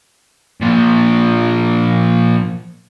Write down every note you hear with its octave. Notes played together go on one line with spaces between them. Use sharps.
A#2 F3